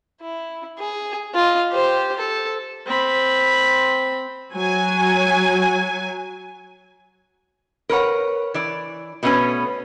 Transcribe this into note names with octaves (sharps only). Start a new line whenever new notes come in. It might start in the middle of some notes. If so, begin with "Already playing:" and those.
E4
G#4
F4 D#5
G4 C5
A4
C4 B5
F#3 G#5
A#4 B4 C#5 F#5
E3 D5
B2 A3 B3 C#4 B4